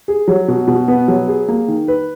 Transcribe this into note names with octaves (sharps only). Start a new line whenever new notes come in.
G#4
F#3
B2
B2
B3
F#3
G#4
A#3
D#3
B4